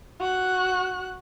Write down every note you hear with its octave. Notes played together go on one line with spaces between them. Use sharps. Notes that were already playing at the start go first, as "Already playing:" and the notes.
F#4 F#6